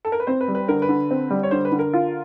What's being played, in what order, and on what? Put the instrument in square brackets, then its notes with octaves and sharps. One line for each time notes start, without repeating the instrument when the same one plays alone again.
[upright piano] A4
A#4
B4
[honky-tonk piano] C4 [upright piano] C5
[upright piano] B4
[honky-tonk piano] G3
[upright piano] B4
[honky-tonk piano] D3 [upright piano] A#4
[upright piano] B4
[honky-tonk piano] D3
C4
G3
[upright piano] C#5
[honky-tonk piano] D3 [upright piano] C5
[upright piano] B4
[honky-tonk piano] D3
[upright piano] A#4
[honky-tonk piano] F4